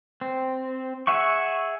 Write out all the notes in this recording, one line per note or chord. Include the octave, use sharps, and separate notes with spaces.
C4
G#4 E5 F#5 C#6